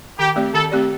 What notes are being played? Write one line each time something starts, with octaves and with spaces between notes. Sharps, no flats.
D#3 G4
A3 C4 G4 D5
D#3 A4
A3 C4 G4 D5